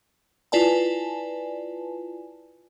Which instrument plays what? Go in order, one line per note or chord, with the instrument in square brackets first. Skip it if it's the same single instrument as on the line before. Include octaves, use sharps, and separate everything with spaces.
[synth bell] E4 F4 B4 D5 G#5 A5